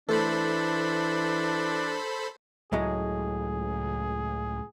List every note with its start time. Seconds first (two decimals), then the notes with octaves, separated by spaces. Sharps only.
0.09 E3 A3 D4 A4 C5 B5
2.73 C#2 A2 F#3 G#3 G#4